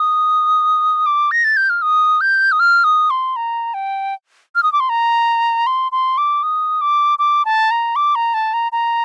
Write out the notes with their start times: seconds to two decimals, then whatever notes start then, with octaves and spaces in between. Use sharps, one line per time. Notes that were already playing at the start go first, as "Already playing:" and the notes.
Already playing: D#6
1.06 D6
1.31 A#6
1.44 A6
1.57 G6
1.70 F6
1.82 D#6
2.21 G6
2.52 D#6
2.60 F6
2.84 D#6
3.10 C6
3.36 A#5
3.74 G5
4.56 F6
4.63 D#6
4.73 D6
4.80 C6
4.89 A#5
5.67 C6
5.92 C6
6.18 D6
6.43 D#6
6.81 D6
7.19 D6
7.45 A5
7.71 A#5
7.96 D6
8.15 A#5
8.34 A5
8.54 A#5
8.72 A#5